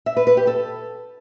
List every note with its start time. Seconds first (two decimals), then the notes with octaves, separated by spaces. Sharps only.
0.06 E5
0.17 B4
0.27 B4
0.37 G4
0.47 A4